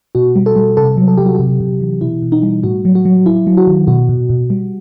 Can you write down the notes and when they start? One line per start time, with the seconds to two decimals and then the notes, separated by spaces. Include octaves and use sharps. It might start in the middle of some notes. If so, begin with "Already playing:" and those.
0.15 B2 F#4
0.36 G3
0.46 A4
0.56 G3
0.77 C3 A4
0.97 F#3
1.08 A4
1.17 F#3 G4
1.26 F#4
1.35 C3 G4
1.60 C3
1.81 E3
2.01 B2 E4
2.22 B2
2.32 D#4
2.42 G3
2.63 A2 F#4
2.85 F#3
2.95 F#4
3.05 F#3
3.26 F#3 E4
3.47 F#3
3.57 F#4
3.67 D#3
3.87 B2 F#4
4.09 B2
4.30 B2
4.50 G3